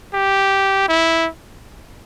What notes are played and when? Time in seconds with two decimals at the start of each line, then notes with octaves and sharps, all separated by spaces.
0.14 G4
0.88 E4